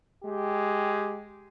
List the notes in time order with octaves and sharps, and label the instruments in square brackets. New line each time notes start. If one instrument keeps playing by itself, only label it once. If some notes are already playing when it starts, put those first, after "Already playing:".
[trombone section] G#3 G4